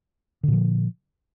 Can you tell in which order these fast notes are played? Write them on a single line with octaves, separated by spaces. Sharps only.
D3 A#2 F3